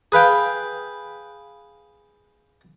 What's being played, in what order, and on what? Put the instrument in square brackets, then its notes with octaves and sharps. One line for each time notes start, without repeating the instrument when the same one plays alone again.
[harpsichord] G#4 B4 F5 G5